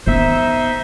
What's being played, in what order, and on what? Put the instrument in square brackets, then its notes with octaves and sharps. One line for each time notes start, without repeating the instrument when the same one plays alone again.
[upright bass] D#3 B3 [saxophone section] D#4 C5 E5